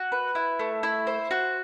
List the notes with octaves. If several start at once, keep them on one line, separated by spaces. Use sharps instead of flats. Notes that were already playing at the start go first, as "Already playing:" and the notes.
Already playing: F#4
B4
E4
A3
E4
C5
F#4